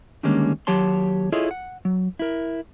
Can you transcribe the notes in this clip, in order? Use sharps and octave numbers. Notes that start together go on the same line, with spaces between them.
D3 D#3 G3 G#3 A#3 C#4
D#2 F#3 G4 C#5 A5 C6
E4 F4 G#4 A4 C#5 D#5
F#5
F#3
E4 A#4